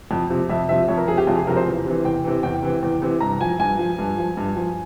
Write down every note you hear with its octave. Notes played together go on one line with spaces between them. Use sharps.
F2
C3 F3
F2 E5
C3 F3 E5
F2 C#5
A#4
C3 F3 G#4
G4
F2 F4
G#4
C3 F3 A#4
C5
E2
C3 E3
E2 G5
C3 E3
E2 G5
C3 E3
E2
C3 E3
G2 A#5
F3 G#5
G2 G#5
F3
G2
F3
G2
F3